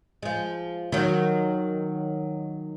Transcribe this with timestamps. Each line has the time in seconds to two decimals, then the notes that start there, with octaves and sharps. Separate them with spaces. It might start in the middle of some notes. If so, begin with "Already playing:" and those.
0.23 F3 G#3
0.92 D#3 F#3